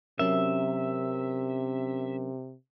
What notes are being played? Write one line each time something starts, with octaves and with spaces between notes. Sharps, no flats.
C3 F#3 C#4 A#4 E5